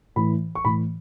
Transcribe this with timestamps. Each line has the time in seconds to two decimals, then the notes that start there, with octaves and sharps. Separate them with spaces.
0.16 A2 E3 B5
0.55 C#6
0.65 A2 E3 B5